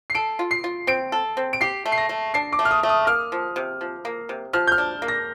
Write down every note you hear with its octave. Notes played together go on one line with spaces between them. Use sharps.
C7
A4 D7
F4
C7
F4
C4 D7
A4
C4
D7
G4 C7
A3
C7
A#6
A3
D4 C7
D6
A3
F6
D#6
A3
D#6
A#3 F6
F3
C3
F3
A#3
C3
F3 F6
G6
F6
D4
A#3
A#6